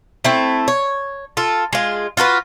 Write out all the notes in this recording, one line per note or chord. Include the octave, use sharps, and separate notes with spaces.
A3 C4 E4
C#5
F4 A4
G#3 F4
F4 F#4 A4 B4